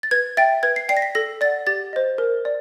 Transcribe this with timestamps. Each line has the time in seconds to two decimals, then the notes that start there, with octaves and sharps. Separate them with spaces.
0.03 A6
0.11 B4 G#6
0.37 E5 G5 A6
0.63 B4 G#6
0.76 C7
0.89 D5 G5 C7
0.97 A#6
1.02 B6
1.15 A4 A#6
1.41 D5 F#5 A6
1.67 G4 A6
1.93 C5 D#5
2.18 A#4
2.45 D5